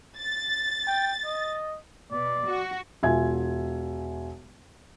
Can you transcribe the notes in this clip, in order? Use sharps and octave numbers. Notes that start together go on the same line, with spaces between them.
A6
G5
D#5
B2 D5
F#4
E1 F4 E5 G#5 G#6